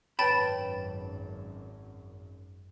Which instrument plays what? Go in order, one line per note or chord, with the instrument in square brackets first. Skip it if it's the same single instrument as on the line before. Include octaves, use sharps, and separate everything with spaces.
[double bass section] G#1 F#2 [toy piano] B4 C#5 [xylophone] G5 A5 A6 [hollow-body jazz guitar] B5